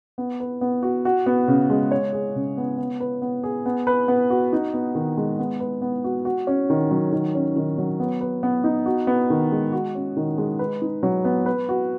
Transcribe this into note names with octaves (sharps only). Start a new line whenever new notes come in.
B3
B4
B3
F#4
F#4
B3
C#3
G#3
C#5
G#4
C#3
B3
B3
B4
B3
G#4
B3
B4
B3
F#4
D#4
B3
D#3
G#3
B3
B4
B3
F#4
F#4
C#4
D#3
F#3
D#3
C#4
D#3
F#3
B3
B4
B3
D#4
F#4
B3
D#3
G#3
F#4
C#4
D#3
G#3
B4
D#4
F#3
B3
B4
F#4